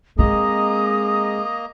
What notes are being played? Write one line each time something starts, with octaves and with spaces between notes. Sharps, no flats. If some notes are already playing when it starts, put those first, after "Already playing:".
G#3 A#3 C4 D#5 A#5 D#6